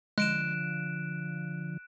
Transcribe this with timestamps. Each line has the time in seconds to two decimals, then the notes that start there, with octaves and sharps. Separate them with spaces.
0.18 D3 F3 G#3 F#6 D7 E7